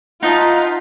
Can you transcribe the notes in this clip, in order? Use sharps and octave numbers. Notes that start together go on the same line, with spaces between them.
D#4 F4 C5 D#5 E5 F#5 A5 A#5